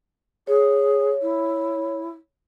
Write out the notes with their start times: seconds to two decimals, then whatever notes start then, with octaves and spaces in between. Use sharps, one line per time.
0.47 G#4 C#5
1.22 E4